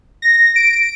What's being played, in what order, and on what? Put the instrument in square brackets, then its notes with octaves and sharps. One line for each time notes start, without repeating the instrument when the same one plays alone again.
[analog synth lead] A#6
D7